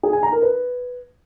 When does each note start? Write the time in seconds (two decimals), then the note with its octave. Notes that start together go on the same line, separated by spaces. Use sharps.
0.03 G#4
0.13 G#5
0.23 A#5
0.33 A#4
0.42 B4